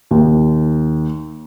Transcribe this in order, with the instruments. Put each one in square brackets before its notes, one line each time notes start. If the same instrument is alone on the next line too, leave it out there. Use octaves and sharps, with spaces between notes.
[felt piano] D#2